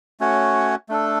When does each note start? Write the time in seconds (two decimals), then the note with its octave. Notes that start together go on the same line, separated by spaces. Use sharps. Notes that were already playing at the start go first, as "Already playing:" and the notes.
0.20 A3 C#4 F#4 C#5
0.89 A3 D4 A4